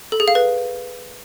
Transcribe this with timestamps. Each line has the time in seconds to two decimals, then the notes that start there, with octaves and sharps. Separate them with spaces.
0.12 A4
0.20 G#4
0.28 F5
0.35 B4